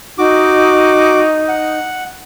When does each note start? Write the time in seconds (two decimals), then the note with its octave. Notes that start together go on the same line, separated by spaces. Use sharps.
0.18 D#4 F#4 D6
1.48 F#5